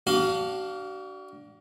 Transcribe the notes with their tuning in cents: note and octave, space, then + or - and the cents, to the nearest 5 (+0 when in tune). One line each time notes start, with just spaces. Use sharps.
D4 +0 F#4 +40 F5 +0